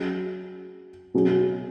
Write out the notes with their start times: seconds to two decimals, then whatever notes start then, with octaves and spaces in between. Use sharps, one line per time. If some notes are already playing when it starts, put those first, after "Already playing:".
Already playing: F#3 C#4 G#4
1.14 B2 F#3 C#4 G#4